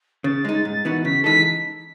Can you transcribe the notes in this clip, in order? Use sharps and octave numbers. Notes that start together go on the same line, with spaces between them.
C#3 A6
G#3 D#4
G#2
E3 B3 D#4 F#4
C#3 B6
E3 G#3 D#4 A4 B6